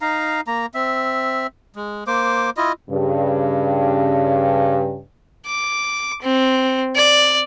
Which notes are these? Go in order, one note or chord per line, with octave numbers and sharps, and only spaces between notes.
D#4 F5 A#5
A#3 A#5
C4 E5
G#3
A#3 C5 D6
E4 F4 D#5
G2 C#3
D6
C4
D5